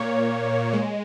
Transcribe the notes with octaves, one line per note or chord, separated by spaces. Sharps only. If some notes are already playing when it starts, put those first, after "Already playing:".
Already playing: A#2 A#3 C#5
G#3